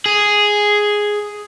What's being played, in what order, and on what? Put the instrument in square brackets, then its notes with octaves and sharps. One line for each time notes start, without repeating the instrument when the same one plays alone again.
[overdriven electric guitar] G#4